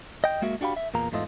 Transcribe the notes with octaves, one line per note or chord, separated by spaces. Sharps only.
D#5 G5
G#3 A#3 F#4 E5
D4 F#4 G4 F5 B5
E5
E2 A#2 A#3 A#5
E2 G#2 A3 F4 D#5